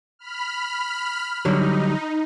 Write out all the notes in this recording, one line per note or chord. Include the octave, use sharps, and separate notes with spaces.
B5 F6
D3 F#3 G3 D#4